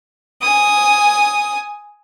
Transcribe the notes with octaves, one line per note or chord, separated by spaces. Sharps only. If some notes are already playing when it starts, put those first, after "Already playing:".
G#5 D#6